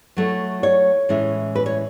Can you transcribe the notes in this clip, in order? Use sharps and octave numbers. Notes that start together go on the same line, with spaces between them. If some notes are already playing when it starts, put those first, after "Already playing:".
F#3 A3 E4
C#5
A2 E3 G#3 C#4 E4
B4
C#5